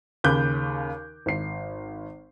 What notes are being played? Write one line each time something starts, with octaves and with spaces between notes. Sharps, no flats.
D#2 C#3 B5 D6 F#6 G6
G#1 C7